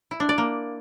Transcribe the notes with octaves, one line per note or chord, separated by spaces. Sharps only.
E4
D4
D5
A#3